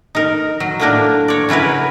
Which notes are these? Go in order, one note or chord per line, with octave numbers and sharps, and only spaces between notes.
D#4 A#4
F#3
A2 F#3 A#3 D4 A#4
C#5 D5
C#3 F#3 E4 A#4 B4